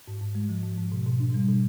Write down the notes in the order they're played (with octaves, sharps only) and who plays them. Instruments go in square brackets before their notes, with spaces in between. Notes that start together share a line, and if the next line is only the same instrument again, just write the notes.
[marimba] G#2
G#2
G#3
F3
G#2
G#2
B2
B2
D4
G3
B2